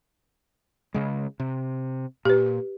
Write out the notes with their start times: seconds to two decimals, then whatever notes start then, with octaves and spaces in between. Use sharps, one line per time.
0.94 C#3 G#3
1.40 C3
2.25 A#2 G4 B4